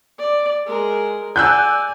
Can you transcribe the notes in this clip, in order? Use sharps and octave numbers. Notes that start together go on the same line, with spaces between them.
D5
G#3 A#4
D5 G#5 E6 F#6 G6